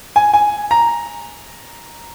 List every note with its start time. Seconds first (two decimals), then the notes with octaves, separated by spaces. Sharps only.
0.16 G#5
0.34 G#5
0.71 A#5